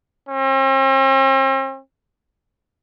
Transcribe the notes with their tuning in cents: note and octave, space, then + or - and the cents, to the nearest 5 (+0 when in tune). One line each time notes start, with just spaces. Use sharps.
C4 +45